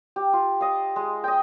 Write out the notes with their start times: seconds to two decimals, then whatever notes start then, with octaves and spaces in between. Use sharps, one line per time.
0.16 G4
0.33 F4
0.61 D#5 F5
0.96 G#3
1.24 D#5 G5